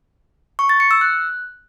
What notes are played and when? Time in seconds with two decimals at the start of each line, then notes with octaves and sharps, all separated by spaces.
0.59 C#6
0.69 A6
0.80 C#7
0.91 E6
1.01 F#6